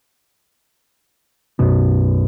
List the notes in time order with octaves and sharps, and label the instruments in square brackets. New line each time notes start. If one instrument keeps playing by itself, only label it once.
[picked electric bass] B1 F#2 B2